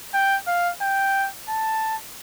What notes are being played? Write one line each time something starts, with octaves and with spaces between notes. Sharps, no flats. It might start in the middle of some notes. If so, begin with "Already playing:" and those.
G5
F5
G5
A5